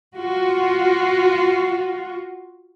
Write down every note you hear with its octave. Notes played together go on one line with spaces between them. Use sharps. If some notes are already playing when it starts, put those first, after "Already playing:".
F4 F#4